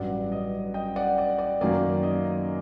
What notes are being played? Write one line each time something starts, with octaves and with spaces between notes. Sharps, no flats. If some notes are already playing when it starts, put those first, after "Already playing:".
Already playing: A1 G2 F#3 D5 F#5
D#5
D#5 G5
D5 F#5
D5
D5
F#2 D#3 F#3 A#3 D5
D#5